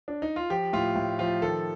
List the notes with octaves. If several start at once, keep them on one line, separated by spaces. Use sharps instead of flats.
D4
D#4
F4
F3 G4
A2 F4
A2
F3 F4
D#3 A4